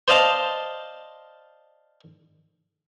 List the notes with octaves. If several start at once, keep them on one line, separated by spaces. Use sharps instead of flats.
C5 D5 D#5 F5 A5